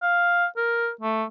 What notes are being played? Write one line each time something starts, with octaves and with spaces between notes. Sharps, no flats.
F5
A#4
A3